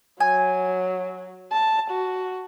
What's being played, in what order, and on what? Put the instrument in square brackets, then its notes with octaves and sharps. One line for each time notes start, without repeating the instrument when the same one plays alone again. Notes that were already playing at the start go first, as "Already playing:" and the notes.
[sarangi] F#3 [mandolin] G#5
[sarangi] A5
F#4